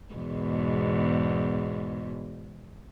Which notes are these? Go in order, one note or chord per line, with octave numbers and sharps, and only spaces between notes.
E2 G#2 B2